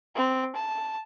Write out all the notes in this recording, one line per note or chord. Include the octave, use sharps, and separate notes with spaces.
C4
A5